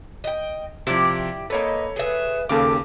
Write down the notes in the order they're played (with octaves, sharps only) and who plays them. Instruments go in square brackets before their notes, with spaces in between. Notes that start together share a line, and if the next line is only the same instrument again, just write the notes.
[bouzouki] D#5 G5
[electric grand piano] C3 F3 [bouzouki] E4 G4 D5
[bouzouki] A#3 B4 [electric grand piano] A4 C#5 [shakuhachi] D#5
[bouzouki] G#4 E5 [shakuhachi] B4
[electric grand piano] D#2 C#3 D6 [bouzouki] G4 F5 [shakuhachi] A4